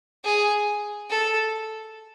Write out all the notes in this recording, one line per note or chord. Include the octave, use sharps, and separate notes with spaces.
G#4
A4